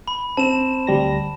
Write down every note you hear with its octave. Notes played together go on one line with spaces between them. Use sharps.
B5
C4 A5 E7
D2 G3 A#6